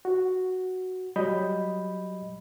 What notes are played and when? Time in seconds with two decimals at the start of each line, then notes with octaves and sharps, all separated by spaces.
0.05 F#4
1.16 F#3 G3 D#5 B5 G6